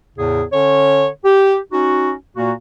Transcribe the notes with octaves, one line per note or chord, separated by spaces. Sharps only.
E2 A2 C#3 G#4
D3 C#4 C#5
G4
C#4 D#4 F#4
A#2 A#3 F#4